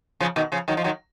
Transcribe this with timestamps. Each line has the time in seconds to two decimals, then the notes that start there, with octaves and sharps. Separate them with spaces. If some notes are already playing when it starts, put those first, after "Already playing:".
0.20 C#3 F3
0.36 B2 D#3
0.52 C#3 F3
0.68 D#3 F#3
0.77 F3
0.84 D#3 F#3